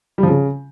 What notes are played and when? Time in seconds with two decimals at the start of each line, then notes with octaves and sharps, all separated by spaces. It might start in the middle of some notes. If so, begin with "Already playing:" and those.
0.18 G3
0.23 F3
0.28 C#3